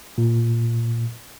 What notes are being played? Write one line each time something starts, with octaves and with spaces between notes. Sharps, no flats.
A#2